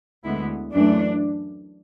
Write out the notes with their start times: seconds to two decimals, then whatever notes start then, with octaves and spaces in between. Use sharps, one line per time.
0.25 D2 D3 G#3 B3 E4
0.73 F#2 E3 A3 D4